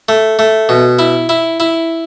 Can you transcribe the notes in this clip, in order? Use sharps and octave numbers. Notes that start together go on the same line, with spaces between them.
A3
A3
B2
E4
E4
E4